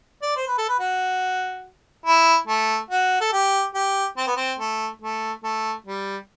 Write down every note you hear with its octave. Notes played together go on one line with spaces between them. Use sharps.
D5
C5
B4
A4
B4
F#4
E4
A3
F#4
A4
G4
G4
C4
B3
C4
A3
A3
A3
G3